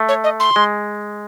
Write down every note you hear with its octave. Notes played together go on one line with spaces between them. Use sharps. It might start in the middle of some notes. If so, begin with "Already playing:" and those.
Already playing: A3
C#5
D#5
C6
G#3